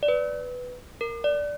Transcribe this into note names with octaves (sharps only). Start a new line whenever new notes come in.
D5
B4
A#4
D5